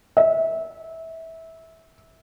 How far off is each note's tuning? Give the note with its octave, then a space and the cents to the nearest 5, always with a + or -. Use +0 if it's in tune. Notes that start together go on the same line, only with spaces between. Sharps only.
E5 -20